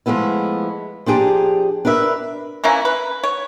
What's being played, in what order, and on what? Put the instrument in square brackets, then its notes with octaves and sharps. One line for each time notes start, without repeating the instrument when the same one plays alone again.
[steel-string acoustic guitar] F3 G#3 A3 B3 E4
F3 D4 G4 G#4 A5 A#5
D4 A#4 B4 E5
[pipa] E3 A#3 C#4 E4
B4
C#5